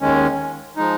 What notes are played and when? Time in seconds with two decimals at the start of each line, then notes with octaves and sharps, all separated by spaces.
0.01 D#2 D#3 G#3 C#4
0.77 F3 G#3 D#4